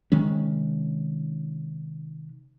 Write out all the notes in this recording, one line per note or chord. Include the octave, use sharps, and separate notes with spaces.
C3 D#3 G#3 C#4